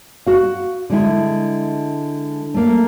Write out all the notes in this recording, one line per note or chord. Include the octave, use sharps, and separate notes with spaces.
F#4 F5
D3 G#3 E4
A3 A#3